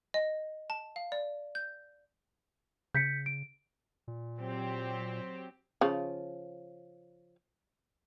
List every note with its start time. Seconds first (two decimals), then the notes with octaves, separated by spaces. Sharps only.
0.14 D#5
0.70 A5
0.96 F5
1.12 D5
1.55 G6
2.95 C#3 G6 B6 C#7
3.26 D7
4.08 A#2
4.41 F#3 C4 G4
5.81 C#3 F3